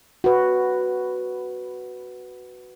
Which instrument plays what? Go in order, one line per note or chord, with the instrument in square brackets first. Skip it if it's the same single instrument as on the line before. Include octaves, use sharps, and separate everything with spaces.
[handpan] F#4 B4